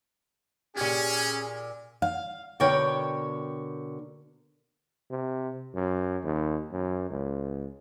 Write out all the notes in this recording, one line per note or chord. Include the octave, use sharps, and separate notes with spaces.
A#2 C#4 G4 G#4
F5
B2 D3 A#4 C#5 G5
C3
F#2
D#2
F#2
C#2